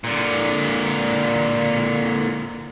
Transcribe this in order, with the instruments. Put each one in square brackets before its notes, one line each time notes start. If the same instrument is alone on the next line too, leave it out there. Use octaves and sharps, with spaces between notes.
[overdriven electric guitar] A#2 D3